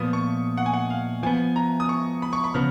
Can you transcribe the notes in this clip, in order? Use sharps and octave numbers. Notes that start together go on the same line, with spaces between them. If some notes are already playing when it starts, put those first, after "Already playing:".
Already playing: A#2 F3 B3 D#6
C#6
F#5
G#5
F#5
F5
F3 B3 G#5
A#5
D#6
C#6
B5
C#6
B5
C#3 F3 B3 F6